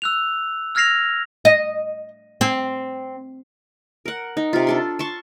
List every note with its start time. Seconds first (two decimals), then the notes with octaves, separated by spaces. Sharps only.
0.02 E6 F#6 F7
0.75 E6 F6 G#6 A#6 C7 F7
1.45 D#5
2.41 C4
4.05 A#4 F#5
4.37 D#4
4.53 C3 F4
4.67 D4 A4 C6
4.99 A5 C6 C#6